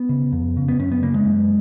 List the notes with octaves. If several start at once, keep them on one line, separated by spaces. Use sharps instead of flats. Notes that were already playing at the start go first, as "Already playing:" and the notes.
Already playing: B3
C#3
F2
C#3
B3
F#2 C#4
B3
C#3 A#3
G#3
F#2